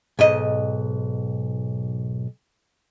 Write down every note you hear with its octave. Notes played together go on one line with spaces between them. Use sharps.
B1 G#2 D#5